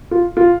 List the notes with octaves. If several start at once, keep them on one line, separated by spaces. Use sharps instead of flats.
F4
F4